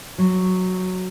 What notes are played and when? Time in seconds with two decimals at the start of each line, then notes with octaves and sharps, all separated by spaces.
0.18 F#3